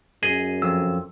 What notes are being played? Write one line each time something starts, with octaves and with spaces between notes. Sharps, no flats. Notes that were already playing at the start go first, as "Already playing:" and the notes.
F#2 G#4 D#5 G#5
F2 E6